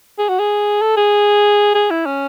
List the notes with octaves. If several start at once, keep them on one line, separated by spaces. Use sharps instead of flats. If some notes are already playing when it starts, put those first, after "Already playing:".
G#4
F#4
G#4
A4
G#4
G#4
E4
C#4